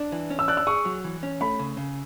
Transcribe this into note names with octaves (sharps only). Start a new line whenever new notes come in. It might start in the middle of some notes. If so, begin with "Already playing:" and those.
Already playing: D4
E3
C#4
E6
D5 F#6
E6
G#4 C#6
F#3
E3
C#4
A3 B5
C#3
C#3